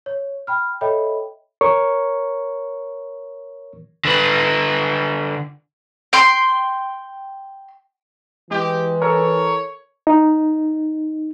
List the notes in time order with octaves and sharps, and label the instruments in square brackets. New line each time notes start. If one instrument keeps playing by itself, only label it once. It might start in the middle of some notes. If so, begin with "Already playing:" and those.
[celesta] C#5
G5 B5 F6
A4 C#5 D#5 E5 G5 B5
[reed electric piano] A#4 C#5 C#6
[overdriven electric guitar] D3 B4
[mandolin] G5 C6
[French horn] E3 [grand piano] G#3 [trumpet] G4
[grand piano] A4 A#4 [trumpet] C#5
[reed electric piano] D#4